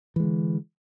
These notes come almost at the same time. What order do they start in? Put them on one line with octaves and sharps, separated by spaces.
E3 G#3 D3